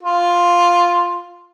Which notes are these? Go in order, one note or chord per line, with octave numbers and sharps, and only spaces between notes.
F4